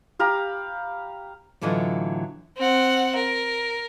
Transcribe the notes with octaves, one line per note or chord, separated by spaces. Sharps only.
G4 F5 A#5 B5
A2 D3 E3 F#3 F4 D#5
C4 F#5
A#4